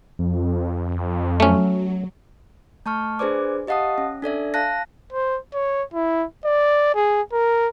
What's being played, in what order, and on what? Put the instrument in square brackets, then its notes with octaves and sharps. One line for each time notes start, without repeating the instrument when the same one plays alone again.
[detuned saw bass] F2
[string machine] F#3 [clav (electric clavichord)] A3 C#4
[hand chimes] A3 A5 C#6 F6
D4 G#4 B4 C5 D5 D6
G4 D#5 F5 F#5 A5 D#6
C#4
D4 A4 D5 E5
F5 A5 F#6 A#6
[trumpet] C5
C#5
E4
D5
G#4
A#4